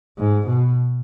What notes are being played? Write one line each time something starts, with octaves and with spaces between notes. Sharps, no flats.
G#2
B2